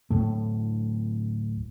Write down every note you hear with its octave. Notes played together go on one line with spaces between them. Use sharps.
D1 G1 A2 A3